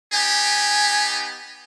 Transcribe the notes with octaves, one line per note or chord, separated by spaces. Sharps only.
B3 D#4 G4 G#5